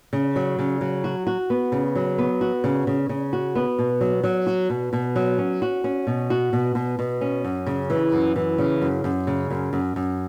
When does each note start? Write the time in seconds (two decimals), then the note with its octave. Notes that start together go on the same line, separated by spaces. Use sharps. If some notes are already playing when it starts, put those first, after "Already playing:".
0.13 C#3
0.36 F#3
0.59 C#3
0.81 F#3
1.04 F#4
1.27 F#4
1.50 B3
1.72 C#3
1.96 F#3
2.18 B3
2.41 F#4
2.64 C#3
2.87 C#3
3.09 C#3
3.33 F#4
3.55 B3
3.79 B2
4.01 F#3
4.24 F#3
4.47 F#4
4.70 B2
4.93 B2
5.16 F#3
5.38 C#4
5.62 F#4
5.84 C#4
6.07 B2
6.30 F#4
6.53 B2
6.75 B2
6.99 B2
7.21 C#4
7.44 F#2
7.67 C#3
7.90 E3
8.12 F#2
8.36 E3
8.58 C#3
8.82 F#2
9.04 F#2
9.27 C#3
9.51 F#2
9.73 F#2
9.96 F#2